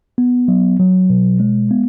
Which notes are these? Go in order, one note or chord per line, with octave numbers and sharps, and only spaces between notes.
B3
F#3
F#3
B2
G#3
B3